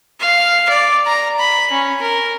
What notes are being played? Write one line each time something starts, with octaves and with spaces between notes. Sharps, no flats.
F5
D5
A#5
B5
C#4
A#4